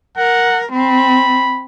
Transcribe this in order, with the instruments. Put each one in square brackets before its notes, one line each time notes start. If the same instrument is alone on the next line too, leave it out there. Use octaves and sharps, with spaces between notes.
[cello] A#4 [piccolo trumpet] F#5
[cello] C4 [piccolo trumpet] B5